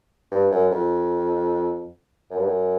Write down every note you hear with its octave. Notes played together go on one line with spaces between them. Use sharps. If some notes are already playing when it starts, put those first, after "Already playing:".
G2
F#2
F2
F#2
G2
F#2